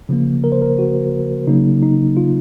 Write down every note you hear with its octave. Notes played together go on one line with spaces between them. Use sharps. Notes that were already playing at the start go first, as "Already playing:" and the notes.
C#3 F3 A#3
A#4
C5
A#4
F#4
C#3 F#3 A#3 D#4
D#4
F4